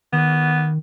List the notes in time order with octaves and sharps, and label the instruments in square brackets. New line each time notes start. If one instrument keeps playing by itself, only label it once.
[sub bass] D#3 [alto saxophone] B3